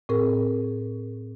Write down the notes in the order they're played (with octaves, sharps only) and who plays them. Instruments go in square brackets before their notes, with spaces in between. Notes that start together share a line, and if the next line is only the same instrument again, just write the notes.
[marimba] A2 C4 G#4 A#4